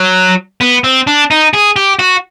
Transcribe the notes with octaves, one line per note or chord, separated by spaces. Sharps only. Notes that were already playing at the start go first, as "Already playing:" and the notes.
Already playing: F#3
B3
C4
D4
D#4
G#4
G4
F#4